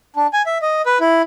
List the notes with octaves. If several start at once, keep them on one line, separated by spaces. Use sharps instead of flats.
D4
G#5
E5
D#5
B4
E4